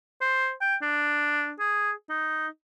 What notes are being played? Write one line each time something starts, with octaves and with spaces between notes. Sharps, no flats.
C5
G5
D4
G#4
D#4